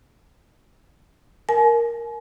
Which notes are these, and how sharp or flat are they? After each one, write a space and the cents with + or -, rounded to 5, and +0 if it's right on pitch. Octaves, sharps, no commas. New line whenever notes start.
A#4 +0 G#5 +40